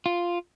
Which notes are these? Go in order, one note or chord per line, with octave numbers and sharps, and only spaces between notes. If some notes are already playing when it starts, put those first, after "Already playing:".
F4